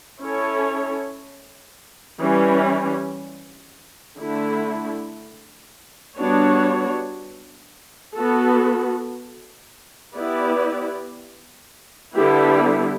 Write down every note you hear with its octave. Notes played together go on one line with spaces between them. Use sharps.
C#4 E4 A4 C#5
E3 G3 C#4
D3 A3 E4
G3 B3 D4 F#4 C#5
B3 F#4 A4
B3 E4 G4 B4 D5
D3 G3 B3 E4 G4